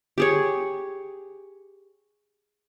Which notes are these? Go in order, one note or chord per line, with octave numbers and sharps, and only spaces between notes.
G4 G#4 C#5